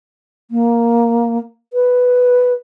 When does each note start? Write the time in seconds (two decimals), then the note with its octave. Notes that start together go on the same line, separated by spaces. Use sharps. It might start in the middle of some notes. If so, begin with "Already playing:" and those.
0.51 A#3
1.73 B4